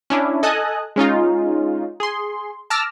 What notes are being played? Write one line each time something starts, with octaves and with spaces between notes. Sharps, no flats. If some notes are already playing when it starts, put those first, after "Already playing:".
C#4 D4 E4
A4 D#5 G#5 A5 D#6 F#6
G#3 C#4 D#4 F4
G#4 C6
A5 D6 E6 F6 A#6